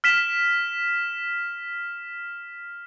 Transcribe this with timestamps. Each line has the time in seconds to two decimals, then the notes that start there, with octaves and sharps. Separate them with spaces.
0.04 F6 B6 E7